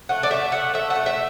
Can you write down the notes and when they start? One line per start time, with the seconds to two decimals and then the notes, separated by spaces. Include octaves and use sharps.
0.09 A3 F#5
0.23 D5
0.31 A3 E5
0.52 A3 F#5
0.74 A3 E5
0.90 F#5
0.96 A3
1.06 E5